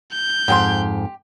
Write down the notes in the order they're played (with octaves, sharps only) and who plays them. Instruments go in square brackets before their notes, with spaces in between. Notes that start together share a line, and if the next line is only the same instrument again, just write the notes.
[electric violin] G6
[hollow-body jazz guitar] F2 G#2 [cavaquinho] G4 G5 C6